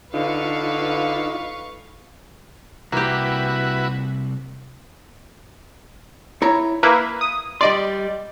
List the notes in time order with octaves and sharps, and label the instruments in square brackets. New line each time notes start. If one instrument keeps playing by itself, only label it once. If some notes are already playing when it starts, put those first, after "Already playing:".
[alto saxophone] D3 [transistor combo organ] D#4 F4 [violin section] B4 F5 C#6
[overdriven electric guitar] C2 [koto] A#3 G4 [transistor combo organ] E4 F#4 B4
[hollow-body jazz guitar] E4 C#5 A#5
[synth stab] A#3 E4 B4 [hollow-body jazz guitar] A#5
[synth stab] D#6
[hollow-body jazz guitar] G3 D#5 C6 [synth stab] D5